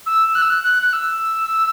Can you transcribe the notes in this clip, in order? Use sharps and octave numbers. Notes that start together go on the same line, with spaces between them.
E6
F#6
E6
F#6
F#6
F#6
E6